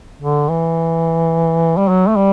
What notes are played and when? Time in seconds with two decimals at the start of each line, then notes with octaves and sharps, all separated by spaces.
0.22 D3
0.50 E3
1.77 G3
1.89 F#3
2.08 A3
2.16 G3